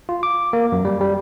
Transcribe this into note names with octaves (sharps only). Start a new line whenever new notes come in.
F4
D6
A#3
F#2
G3
G3